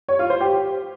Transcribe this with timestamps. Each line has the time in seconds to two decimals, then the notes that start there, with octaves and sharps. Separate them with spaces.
0.08 C#5
0.19 F4
0.30 C5
0.41 G4